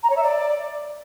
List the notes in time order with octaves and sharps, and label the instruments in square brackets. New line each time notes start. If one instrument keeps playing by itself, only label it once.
[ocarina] A#5
C#5
E5
D5